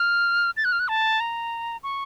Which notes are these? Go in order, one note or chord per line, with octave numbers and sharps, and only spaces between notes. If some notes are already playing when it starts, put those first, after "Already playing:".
Already playing: F6
A6
F#6
F6
F#6
A5
A#5
C#6